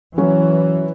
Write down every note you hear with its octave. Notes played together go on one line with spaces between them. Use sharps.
E3 F#3 C#4 F#4